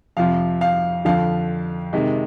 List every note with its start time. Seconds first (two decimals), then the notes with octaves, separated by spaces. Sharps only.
0.17 F2 C3 F3 F5
0.61 F5
1.05 F2 D3 F3 F5
1.93 C3 D#3 G#3